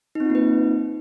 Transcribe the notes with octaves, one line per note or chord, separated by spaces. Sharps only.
A#3 C4 D#4 F4 B4